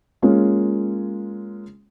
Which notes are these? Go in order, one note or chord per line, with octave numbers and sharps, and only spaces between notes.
G#3 A#3 C#4 F4